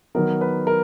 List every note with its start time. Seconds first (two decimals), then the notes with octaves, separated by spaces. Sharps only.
0.15 D#3 F#3 B3 A#4
0.41 B4
0.67 A#4